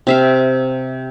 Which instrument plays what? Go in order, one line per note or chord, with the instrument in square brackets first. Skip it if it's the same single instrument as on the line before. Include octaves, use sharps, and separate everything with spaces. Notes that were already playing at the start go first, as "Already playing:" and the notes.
[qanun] C3 E5 F5